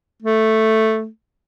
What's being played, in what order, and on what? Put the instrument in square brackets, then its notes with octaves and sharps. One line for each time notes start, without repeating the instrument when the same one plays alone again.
[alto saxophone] A3